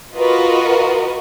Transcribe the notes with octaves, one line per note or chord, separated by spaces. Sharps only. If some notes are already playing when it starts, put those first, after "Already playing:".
F4 F#4 A#4 B4 D#5